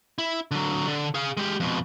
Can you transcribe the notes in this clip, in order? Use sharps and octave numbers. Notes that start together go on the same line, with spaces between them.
E4
D3 F#3
D3
G#4 F5
G#3 G4
F2 B2